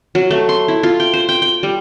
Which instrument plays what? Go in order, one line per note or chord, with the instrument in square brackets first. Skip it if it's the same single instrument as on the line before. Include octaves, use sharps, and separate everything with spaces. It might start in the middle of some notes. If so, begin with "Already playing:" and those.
[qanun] F#3
A3
C6
E4
F4
G5
C5
G5
G5
G3